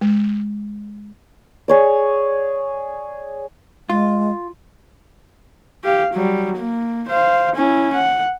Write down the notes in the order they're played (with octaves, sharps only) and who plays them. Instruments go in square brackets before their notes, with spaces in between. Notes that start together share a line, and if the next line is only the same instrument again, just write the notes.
[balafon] G#3
[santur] G#4 C#5 D5
[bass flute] G#3 [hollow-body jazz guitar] F4
[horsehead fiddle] G4 F5
F#3 G3
A#3
C5 F5
C#4 E4
F#5